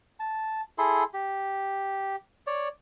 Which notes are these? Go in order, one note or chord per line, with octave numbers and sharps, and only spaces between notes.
A5
E4 G#4 A4 C6
G4
C#5 D5